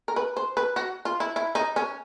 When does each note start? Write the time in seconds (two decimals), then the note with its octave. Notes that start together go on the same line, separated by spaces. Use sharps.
0.08 A#4
0.16 B4
0.37 C5
0.57 B4
0.76 F#4
1.05 F4
1.20 E4
1.36 E4
1.55 D#4
1.76 C#4